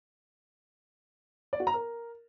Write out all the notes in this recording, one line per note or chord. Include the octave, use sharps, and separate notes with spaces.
D5
F#4
A#5
A#4